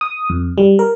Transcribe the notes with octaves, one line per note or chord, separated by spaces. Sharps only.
D#6
F2
G3
A#4